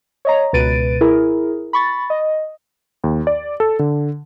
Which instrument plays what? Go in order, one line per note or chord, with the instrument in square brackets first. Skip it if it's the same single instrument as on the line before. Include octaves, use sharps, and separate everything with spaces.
[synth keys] C#5 D#5 A#5
C#2 B2 B4 A6 D7 D#7
E4 G#4 A#4
B5 C#6 A6
D#5
[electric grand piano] D#2
D5
A4
D3